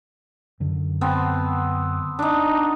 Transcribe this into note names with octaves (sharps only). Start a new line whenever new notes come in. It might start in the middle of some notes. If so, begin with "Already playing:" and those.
F#2 D3
B3 C4 A5
D4 D#4